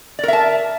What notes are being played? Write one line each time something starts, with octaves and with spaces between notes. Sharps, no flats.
A#4 D5 E5 A5